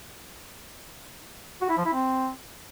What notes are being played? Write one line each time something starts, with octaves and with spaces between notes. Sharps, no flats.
F#4
E4
F3
E4
C4